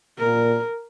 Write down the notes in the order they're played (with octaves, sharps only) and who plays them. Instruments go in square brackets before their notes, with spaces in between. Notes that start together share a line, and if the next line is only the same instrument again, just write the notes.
[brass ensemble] A#2 [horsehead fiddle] A#4